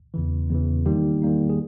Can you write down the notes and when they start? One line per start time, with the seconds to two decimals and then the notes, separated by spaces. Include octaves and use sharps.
0.14 E2 C#3 E3
0.50 E2 C#3 E3
0.86 D#3 G3 A#3 D#4 G4
1.22 D#3 G3 A#3 D#4
1.50 G#4